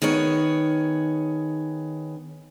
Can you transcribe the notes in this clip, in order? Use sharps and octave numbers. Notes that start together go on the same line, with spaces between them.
D#3 B3 G#4 C#5